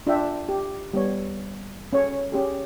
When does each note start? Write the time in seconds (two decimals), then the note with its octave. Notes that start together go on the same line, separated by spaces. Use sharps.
0.07 D4 F4 E5 G5
0.49 G4
0.94 G3 B3 C#5
1.93 C#4 A4 C#5
2.32 C#4 G4 G#4